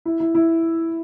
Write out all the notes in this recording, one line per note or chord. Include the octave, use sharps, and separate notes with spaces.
E4
E4
E4